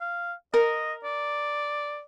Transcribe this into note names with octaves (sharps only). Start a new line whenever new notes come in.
F5
A#4 D#5
D5